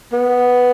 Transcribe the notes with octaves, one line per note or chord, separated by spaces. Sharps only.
B3